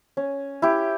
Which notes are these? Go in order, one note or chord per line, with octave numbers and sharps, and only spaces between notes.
C#4
E4 G4